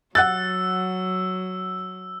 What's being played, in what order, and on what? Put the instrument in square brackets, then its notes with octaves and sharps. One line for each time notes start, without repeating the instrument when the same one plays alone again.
[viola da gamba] F#3 [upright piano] F#5 F#6 A6 [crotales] E6